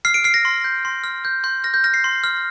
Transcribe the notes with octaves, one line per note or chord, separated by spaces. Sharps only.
F6 C7
D7
F6 C7
A#6
C6
G6
C6
F6
F6 G6
C6 G6
F6 A#6
G6
F6 A#6
C7
C6
F6